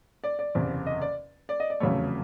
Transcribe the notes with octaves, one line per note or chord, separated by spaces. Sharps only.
D5
D5
F#1 E2 C3
D#5
D5
D5
D#5
D5
F1 E2 C#3 F#3 A3 C#5